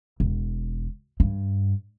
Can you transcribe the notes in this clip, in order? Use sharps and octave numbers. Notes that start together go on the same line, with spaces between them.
E1
G2